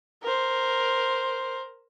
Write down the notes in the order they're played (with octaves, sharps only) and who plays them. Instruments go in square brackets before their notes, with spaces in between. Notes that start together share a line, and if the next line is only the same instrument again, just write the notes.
[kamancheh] A#4 C5